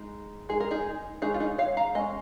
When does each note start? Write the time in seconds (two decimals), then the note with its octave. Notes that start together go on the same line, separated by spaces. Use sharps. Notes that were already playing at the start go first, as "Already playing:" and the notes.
Already playing: G#3 D#4
0.49 G#3 D#4 G#4
0.60 A#4
0.71 D#4 G#4
1.22 G#3 C#4 D#4 G#4
1.34 F4
1.40 D#4 G#4
1.58 C#5 F5
1.77 F5 A#5
1.95 G#3 D#5 G#5
1.98 C#4